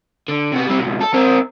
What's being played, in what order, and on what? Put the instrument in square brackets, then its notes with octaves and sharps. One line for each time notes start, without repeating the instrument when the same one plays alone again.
[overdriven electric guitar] D3
C3 B3
G3 C4
C#2 B2
A4
C4 A#4